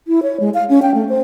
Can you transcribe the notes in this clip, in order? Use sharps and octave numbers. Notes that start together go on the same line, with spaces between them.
E4
C#5
G#3
F5
C#4
G5
A3
C5